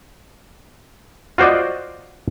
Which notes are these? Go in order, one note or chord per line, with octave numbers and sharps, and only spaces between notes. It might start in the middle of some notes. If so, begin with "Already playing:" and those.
F4 F#4 C5 D5 D#5